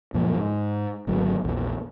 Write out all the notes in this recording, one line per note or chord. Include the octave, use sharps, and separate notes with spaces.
C#2 F#2 A#2 F3
G#2
G#1 D2 F#3
A#1 E2